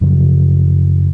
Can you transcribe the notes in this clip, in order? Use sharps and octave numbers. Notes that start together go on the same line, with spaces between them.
F#2 C#3 F3 F#3